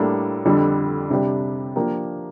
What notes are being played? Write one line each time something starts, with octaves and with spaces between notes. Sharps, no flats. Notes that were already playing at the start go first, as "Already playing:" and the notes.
Already playing: A2 G3 A#3 D4 A4
F2 D3 G3 D4
C3 G3 D4 G4
F3 A#3 D4 G4 A#4